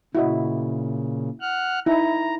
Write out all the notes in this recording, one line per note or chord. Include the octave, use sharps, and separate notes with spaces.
A#2 C#3 E4 F#4 D#5
F#5 F6 F#6
D#4 E4 A#5